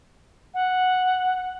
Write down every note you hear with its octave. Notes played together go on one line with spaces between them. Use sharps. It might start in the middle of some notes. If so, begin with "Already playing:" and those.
F#5